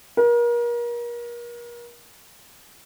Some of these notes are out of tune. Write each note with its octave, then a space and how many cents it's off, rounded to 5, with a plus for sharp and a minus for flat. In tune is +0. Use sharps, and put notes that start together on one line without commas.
A#4 +35